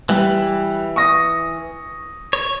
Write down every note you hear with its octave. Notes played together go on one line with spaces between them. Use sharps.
E3 G3
C#6 D#6 A#6
C#5